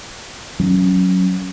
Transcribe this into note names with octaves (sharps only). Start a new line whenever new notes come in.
F#3 C#4